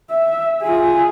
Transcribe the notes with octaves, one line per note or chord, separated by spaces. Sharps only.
E5
F4 G#4